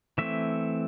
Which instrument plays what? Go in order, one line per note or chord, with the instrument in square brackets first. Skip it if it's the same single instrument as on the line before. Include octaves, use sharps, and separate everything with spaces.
[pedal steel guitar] E3 A3 C4 E5